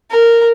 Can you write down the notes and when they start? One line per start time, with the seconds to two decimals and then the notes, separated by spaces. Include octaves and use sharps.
0.11 A#4